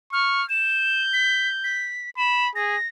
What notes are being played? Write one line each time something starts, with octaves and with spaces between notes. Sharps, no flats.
C#6 F6
G6 E7
B6
B6
B5 E7
G#4 A#6